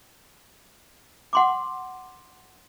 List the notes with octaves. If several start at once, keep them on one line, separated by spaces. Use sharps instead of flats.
F#5 C6 D6